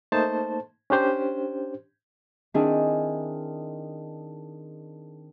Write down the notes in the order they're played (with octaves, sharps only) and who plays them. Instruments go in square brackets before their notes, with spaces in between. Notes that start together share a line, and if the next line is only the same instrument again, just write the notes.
[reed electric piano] A3 A#3 D#4 C5 A5
C#4 D4 G4 C5
[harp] D#3 C4 D4 E4 G#4